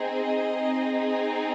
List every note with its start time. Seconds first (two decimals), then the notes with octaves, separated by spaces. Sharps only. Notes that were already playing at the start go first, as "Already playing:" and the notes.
Already playing: C4 D#4 G#4
0.14 D#5
0.54 C4 D#4 G#4